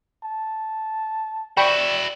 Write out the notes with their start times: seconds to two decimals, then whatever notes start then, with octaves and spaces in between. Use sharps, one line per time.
0.23 A5
1.57 E4 F#4 D5 G5 B5 C#6